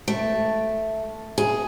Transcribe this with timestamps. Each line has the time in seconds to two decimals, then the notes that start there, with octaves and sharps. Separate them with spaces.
0.08 A3
1.38 G#4